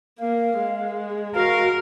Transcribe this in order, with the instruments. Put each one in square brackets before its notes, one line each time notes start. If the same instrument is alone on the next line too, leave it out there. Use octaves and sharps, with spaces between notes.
[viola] A#3 [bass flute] F5
[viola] G#3
[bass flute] F#4 [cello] A#4 [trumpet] F5